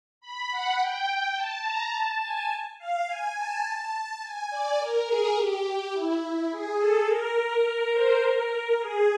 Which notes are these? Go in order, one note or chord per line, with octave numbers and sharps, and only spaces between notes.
B5
F#5
G5
A5
A#5
A5
G#5
F5
G#5
A5
G#5
D5
A#4
G#4
G4
E4
E4
G#4
A4
A#4
C5
A#4
G#4